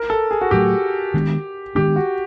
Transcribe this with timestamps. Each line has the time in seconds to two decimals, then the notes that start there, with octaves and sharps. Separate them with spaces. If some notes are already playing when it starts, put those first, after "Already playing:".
Already playing: A#4
0.10 A4
0.31 G#4
0.41 F#4
0.51 A2 F#3 A3 G4
1.14 D#3 G#3 B3 D4
1.75 D#3 G#3 B3 D4 G4
1.96 F#4